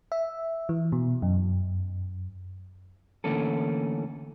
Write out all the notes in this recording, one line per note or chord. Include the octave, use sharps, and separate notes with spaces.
E5
E3
B2
F#2
D3 E3 A3 A#3 C#4 A4